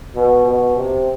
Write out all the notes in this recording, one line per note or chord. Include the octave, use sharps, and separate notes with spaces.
B2
B2
C3